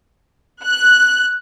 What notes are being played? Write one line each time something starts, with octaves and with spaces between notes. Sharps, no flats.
F#6